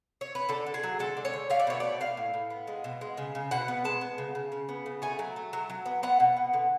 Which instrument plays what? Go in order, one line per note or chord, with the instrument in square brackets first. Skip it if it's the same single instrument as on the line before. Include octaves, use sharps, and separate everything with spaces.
[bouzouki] C#5
B4
D3 A4
D3
G#4
F#3
G#3 A4
D3
C#5
D3
A3 F5
D5
B2 C#5
A3 D5
B3 F5
A2
A2
B3
G#3
B2
G#3
C#3
C#3
B2 F#5
B3
G#3 A5
B3
C#3
C#3
C#3
B3
C#3
A3 G#5
F#3
A3
F#3
F#3
B3
B3 F#5
B2
B3
D3